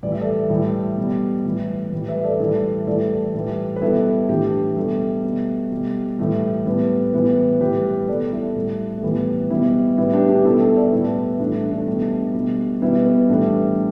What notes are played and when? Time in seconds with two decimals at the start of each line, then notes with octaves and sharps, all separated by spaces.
0.03 A2 E3 G3 D5
0.12 E5
0.21 A4 D5
0.50 A2 E3 G3
0.97 B2 G3
1.45 A2 E3 G3
1.92 A2 E3 G3
2.08 B4 E5
2.24 A4 D5
2.40 A2 E3 G3 E4 A4
2.87 A2 E3 G3 A4 D5
3.34 A2 E3 G3
3.76 B4
3.82 B2 G3 E4 A4
4.29 A2 E3 G3 D4 G4
4.77 B2 G3 A3
5.24 B2 G3
5.71 B2 G3
6.18 A2 E3 G3 A3
6.66 A2 G3 B3
7.13 A2 E3 G3 B3
7.61 A2 E3 G3 G4 B4
8.08 B2 G3 A4 D5
8.32 E4 A4
8.56 A2 G3
8.98 A3
9.03 A2 E3 G3 B3
9.50 B2 G3 B3 E4
9.98 A2 G3 B3 E4
10.13 D4 G4
10.29 D4 G4
10.45 B2 G3 E4 A4
10.60 E4 A4
10.77 A4 D5
10.92 A2 G3 B3 E4
11.40 A2 E3 G3 A3 D4
11.71 A3 D4
11.87 B2 G3
12.34 B2 G3
12.82 B2 G3 B3 E4
13.05 B3
13.29 A2 E3 G3 A3 D4